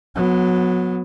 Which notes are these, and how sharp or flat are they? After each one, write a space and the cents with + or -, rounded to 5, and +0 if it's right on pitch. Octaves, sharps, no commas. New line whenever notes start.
F#3 -20 B3 +0